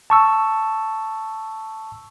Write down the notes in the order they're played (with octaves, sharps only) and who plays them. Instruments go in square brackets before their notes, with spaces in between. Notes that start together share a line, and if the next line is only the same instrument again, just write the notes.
[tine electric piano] A5 C#6 E6